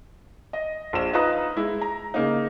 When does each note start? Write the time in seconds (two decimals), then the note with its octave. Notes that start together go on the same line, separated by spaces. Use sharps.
0.53 D#5
0.93 A#1 E7
1.13 D#4 F4 B4 A#5 D#6
1.57 G#3 E4
1.81 A#5
2.14 C#3 A#3 D#4